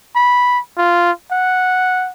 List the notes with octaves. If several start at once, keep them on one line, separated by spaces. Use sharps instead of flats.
B5
F4
F#5